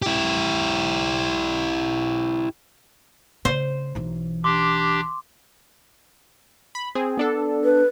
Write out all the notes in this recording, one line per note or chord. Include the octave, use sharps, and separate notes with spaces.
E4 G4
C#3 C5
B1 E3
D4 G4 C6 D6
B5
C4 G#4
B3 D4 A4
B4